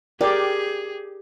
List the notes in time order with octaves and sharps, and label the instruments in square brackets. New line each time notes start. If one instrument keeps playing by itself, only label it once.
[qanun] G4 [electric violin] G#4 [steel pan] A#4 D5 G5